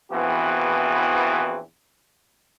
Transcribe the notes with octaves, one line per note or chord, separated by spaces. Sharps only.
A#1 E2 E3 B3 C4 F#4